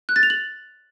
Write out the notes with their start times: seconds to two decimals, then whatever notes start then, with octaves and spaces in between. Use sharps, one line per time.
0.09 F#6
0.16 A6
0.23 F7
0.30 F#7